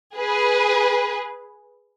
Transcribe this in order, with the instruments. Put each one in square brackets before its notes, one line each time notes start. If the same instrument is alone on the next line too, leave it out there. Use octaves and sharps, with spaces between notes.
[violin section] G#4 B4